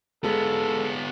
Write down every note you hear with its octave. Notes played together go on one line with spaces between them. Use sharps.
G#3 B3 F4 A4